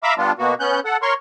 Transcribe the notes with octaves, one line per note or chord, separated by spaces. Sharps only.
E5 F5 A#5 B5 D6 E6
G3 B3 D4 F4
B2 A#3 B3 F#4
B3 C#4 F#6 G6
A4 F#5
A#4 C#5 C6 C#6